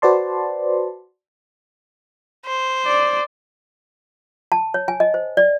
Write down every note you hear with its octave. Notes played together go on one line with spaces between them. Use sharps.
F#4 B4 C5 D5 A5 C6
C5
D5
A5
C#5
G#5
D#5
C5
D5